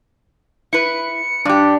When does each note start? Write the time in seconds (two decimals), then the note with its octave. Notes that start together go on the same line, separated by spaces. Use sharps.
0.73 E4 B4 C#7
1.45 G2 D4 G4